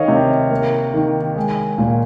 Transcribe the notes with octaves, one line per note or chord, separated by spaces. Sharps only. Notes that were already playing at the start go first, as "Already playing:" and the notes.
Already playing: D#3 C#5 D#5 F5
C3
A#3
D#3
G#3
A#2